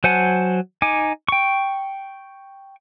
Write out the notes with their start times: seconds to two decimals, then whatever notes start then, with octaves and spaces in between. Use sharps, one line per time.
0.04 F#3 C5 F#5 G#5 A5
0.82 D#4 G#5 D6
1.28 G5 C#6